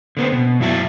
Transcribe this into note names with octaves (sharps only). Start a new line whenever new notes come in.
D3 B3 C4
B2
F#2 F#3 E4 F#4 E5 A5